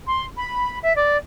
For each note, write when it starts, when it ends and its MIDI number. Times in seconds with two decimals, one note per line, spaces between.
0.07 0.25 84
0.36 0.78 83
0.83 0.93 76
0.95 1.17 74